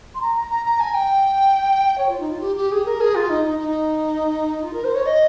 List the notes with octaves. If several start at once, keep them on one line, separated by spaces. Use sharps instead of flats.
C6
A#5
A#5
A#5
A#5
G#5
G5
C#5
F4
D#4
F4
G4
G4
G#4
A#4
G#4
F4
D#4
D#4
D#4
F4
A#4
C5
C#5
D#5